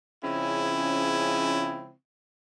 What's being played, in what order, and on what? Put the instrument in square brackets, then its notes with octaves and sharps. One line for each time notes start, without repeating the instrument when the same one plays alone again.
[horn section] C#3 F3 G#3 C4 C#4 E4